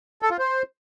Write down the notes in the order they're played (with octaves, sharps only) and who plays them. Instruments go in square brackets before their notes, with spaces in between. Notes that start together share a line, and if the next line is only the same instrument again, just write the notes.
[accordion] A4
F4
C5